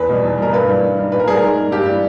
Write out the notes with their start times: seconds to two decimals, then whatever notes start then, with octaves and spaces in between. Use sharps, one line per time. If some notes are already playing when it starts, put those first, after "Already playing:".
Already playing: E2 B4
0.09 B2 G3
0.24 E2
0.38 B2 G3 A#4
0.53 G2 B4
0.68 E3 G3
0.83 G2
0.98 D#3 G3
1.12 A#2 B4
1.19 A#4
1.28 G3 G#4
1.35 A#4
1.42 G#2
1.58 G3
1.72 G2 G4
1.86 E3 G3